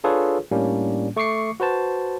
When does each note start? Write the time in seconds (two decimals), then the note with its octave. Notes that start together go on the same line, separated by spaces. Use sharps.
0.04 D4 F4 G#4 A4 B4 C#5
0.51 A2 G3 A#3 C#4 D4
1.16 A3 C#6 D6 C7 C#7
1.60 F#4 B4 C5 A5